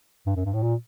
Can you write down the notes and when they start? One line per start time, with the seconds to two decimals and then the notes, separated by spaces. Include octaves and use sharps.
0.26 G2
0.36 F#2
0.45 G2
0.53 A2
0.62 A#2